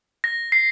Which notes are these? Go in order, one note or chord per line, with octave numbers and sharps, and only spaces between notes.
A#6
C7